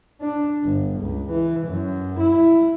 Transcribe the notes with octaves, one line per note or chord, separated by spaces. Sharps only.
D4
G1
C#2
E3
F#2
E4